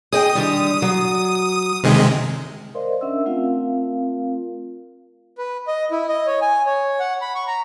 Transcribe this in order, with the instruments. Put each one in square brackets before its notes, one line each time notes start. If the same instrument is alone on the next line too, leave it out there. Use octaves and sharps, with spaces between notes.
[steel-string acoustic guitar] G#4 D#5 G5 [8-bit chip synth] D#6
[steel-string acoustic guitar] D3 D#3 G3
F#3
[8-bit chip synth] C3 D#3 G#3
[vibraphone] A#4 C5 D5 D#5 F5 C6
C#4 D4 A#4 E5 F#5 E6
A3 C4 F4 A#4 F5
[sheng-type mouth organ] B4
D#5
E4
D#5
C#5
G#5
C#5
F#5
B5
C#6
A#5